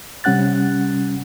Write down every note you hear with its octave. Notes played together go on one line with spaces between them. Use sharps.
C3 G3 C#4 F#5 F#6 A6